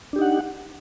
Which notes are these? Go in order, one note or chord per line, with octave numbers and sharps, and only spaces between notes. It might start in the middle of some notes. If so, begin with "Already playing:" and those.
D4 D#4 G4 F#5